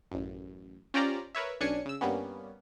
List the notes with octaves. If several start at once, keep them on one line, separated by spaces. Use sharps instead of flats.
A1 F#2
C#4 F4 G4 C5 D5 A#5
A#4 B4 C#5 E5
B1 C#4 D4 G#5 C#7
C#3 E6
G2 G3 A#3 B3 C#4